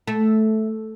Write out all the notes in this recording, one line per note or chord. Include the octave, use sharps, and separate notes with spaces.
A3